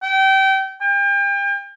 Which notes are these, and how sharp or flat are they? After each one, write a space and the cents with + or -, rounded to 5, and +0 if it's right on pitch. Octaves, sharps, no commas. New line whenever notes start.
G5 -25
G5 +35